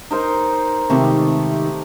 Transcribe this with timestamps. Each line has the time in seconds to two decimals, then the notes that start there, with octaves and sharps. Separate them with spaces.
0.11 D#4 A#4 C5
0.90 G#2 C3 D#3 A3 G4